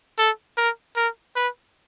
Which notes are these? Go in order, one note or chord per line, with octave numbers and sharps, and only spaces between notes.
A4
A#4
A#4
B4